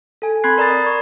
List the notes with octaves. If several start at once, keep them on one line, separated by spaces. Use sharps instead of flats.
A4 G#5
C4 B5 C6 F#6 G#6 C7
A#4 D5 A#5 B5 D#6 A6
D5
C#6